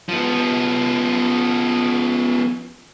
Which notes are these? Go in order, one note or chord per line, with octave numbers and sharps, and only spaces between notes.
F3 B3